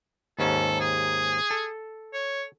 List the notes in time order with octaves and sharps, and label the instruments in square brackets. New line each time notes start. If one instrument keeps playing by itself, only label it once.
[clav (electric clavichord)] D#2 G#2 C#4 [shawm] A4
[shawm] G#4
[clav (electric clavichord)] A4
[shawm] C#5